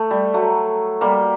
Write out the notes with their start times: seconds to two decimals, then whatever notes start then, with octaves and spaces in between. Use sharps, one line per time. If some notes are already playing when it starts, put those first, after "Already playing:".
Already playing: A3
0.11 G3
0.34 F#3 A3
1.01 G3 A#3